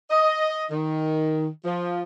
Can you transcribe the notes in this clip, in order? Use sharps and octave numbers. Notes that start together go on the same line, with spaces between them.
D#5
D#3
F3